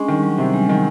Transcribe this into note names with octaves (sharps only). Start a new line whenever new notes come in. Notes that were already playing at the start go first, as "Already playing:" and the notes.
Already playing: G#3 C#4 D4
D#3 G3
F#3
C3 G3
G#3
G3
D#3 F#3